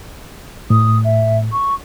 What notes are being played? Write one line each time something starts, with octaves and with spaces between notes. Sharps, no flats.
A2 D#6
E5
C#6